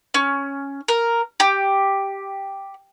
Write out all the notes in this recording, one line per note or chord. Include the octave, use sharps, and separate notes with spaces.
C#4
A#4
G4